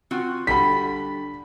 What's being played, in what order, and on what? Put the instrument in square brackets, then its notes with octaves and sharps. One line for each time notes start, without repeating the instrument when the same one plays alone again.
[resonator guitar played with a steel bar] C4 F4 F#4
[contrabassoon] D3 [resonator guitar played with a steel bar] G3 [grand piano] B5 B6